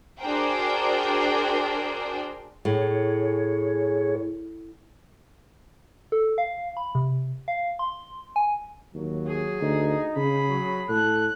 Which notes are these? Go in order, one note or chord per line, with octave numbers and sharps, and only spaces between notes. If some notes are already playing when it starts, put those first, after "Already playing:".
D4 F#4 G#4 A#4 C5 G5
A2 G#4 C#5
A4
F5
B5
C3
F5
C6
G#5
D#2 F#3
G#4
D2 D#4
C#3 G#4 B5
F#3
A2 A4 F#6